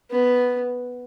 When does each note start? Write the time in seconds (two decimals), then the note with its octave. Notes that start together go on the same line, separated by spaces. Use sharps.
0.11 B3